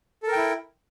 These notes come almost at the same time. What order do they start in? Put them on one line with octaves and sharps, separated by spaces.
A4 A#4 G5 E4